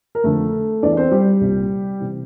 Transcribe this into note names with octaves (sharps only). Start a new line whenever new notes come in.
A#4
F2 D3 A3 A4
E2 E3 D4 D5
D5
C4 C5
G3 G4
C2 A#2
C3 E3